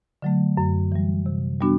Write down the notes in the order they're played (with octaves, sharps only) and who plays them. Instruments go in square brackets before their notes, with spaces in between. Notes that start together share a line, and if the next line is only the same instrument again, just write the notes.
[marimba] D3 F#3 A3
F#2
E3 G3
C3
G3 B3 D4 F#4